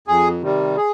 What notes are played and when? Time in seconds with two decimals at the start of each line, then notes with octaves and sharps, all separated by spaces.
0.08 F2 G#4
0.42 C3 D#3 G3
0.77 G#4